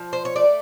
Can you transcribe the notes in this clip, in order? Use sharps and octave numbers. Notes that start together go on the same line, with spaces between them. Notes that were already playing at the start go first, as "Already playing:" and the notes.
Already playing: F3
C5
C#5
A3 D5